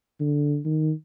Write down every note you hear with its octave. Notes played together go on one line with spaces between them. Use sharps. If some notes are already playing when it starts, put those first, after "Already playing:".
D3
D#3